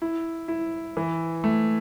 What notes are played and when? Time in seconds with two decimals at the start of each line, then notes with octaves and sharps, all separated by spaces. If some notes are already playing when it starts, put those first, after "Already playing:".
0.02 E4
0.48 E4
0.97 E3
1.44 A3